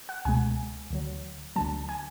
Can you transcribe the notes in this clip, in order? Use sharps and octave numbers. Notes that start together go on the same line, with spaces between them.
F#5
C#2 B2 G#3 G#5
D2 D3 F#3
D2 D3 F#3 A5
G#5